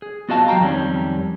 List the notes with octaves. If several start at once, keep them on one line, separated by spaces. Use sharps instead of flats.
G#4
B3 F4 F#4 D#5 F5 A5
F#3 G4 B4 F5 G5 A#5
F2 D#3 G3 C#4